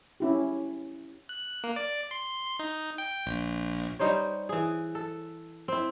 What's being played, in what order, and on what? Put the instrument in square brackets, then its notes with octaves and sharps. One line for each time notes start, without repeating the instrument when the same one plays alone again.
[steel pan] C#4 E4 G4
[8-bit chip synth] F#6
A#3
D5
C6
C6
D#4
G5
A#1
[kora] G3 D#4 C5 C#5
E3 G#4
A4
C4 E4